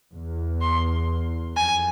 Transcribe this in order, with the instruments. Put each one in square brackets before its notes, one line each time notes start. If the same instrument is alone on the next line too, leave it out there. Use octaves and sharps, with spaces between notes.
[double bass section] E2
[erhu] C6
[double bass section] F2 [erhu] G#5